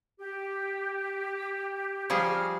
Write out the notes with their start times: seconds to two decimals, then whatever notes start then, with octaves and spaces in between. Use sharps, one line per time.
0.20 G4
2.10 F3 G3 G#4 A#5 C#6 F6